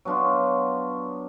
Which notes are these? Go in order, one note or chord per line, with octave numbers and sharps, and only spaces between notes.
F#3 B3 D4 F4